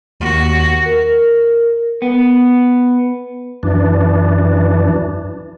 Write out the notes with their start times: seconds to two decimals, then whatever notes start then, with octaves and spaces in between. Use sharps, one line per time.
0.20 D#2 F#4
0.86 A#4
2.02 B3
3.63 F#2 E3 D4